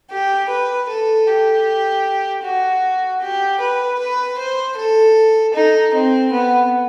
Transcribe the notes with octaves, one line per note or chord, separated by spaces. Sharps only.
G4
B4
A4
G4
F#4
G4
B4
B4
C5
A4
D#4
C4
B3